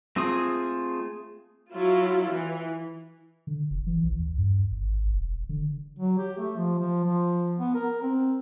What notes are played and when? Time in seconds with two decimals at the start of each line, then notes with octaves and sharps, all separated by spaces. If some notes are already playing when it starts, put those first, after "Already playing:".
0.16 A3 C4 F4 G#4 D#6
1.71 F#3 E4 F4
2.29 E3
3.47 D3
3.71 F1
3.87 E3
4.03 B1
4.20 D#2
4.37 G2
4.71 G#1
5.11 E1
5.49 D3
5.99 F#3
6.18 G4
6.38 A3
6.57 F3
6.79 F3
7.04 F3
7.59 B3
7.75 A#4
8.02 C4